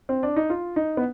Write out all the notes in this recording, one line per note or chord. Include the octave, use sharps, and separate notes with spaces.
C4
D4
D#4
F4
D#4
B3